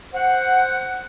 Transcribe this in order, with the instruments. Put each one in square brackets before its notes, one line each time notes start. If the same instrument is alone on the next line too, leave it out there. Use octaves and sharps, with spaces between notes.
[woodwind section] C5 F#5